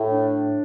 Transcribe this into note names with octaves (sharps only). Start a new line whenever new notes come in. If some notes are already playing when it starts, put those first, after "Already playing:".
Already playing: A2
D4